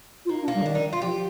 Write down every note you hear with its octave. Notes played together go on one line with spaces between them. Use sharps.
F4
A#3 D#4
D4
A#3
G3
D3
D#3 D4
D#4
F4
F3 G4